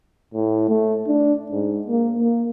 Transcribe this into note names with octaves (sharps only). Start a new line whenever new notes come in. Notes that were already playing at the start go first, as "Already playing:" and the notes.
A2
A3
D4
G#2
A#3
A#3